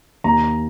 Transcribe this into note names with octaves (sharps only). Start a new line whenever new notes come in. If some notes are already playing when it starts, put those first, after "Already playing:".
D#2 A#5